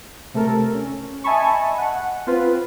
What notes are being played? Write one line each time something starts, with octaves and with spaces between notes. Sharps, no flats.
C3 A3 A4 A#4
C#4
D#5 E5 G#5 A5 B5 C#6
F#5
C4 F4 B4